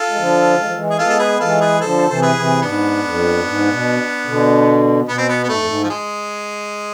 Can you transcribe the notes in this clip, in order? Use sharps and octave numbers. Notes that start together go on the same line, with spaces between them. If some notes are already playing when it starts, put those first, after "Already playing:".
Already playing: F4 A4
G#3
D3 F3
G#3
F3
E3 G#3
G#4
G#3 B3 F4 A4
A4
G#4 B4
E3 G#3 F4 A4
G#4 B4
D3 F3 A4 C5
C3 E3 C5
G#4 B4
C3 E3
G#2 B3 D4
F2
G#2
B2
B2 D3
B2 B3
C4
B3
B3
G#2 A3
F2
G#2
F3
G#3